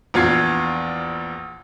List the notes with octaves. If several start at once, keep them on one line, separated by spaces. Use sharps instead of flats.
A#1 E2 F4 G#6 C7